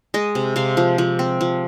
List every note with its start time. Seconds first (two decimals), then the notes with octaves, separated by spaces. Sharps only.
0.14 G#3 D#5
0.35 C3
0.56 C3 F5
0.77 F3
0.98 F3
1.19 C4
1.41 F3